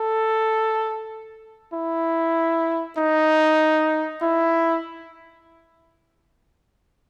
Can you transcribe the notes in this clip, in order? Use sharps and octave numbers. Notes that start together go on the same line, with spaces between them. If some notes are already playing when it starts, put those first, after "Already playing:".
Already playing: A4
E4
D#4
E4